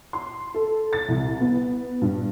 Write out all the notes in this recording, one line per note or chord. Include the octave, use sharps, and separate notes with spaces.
C6
A4
A6
C2
B3
G2